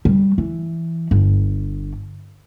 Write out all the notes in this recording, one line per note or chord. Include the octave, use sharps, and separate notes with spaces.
G3
E3
G1